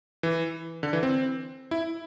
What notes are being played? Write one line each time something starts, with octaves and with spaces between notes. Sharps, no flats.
E3
D3
E3
C4
E4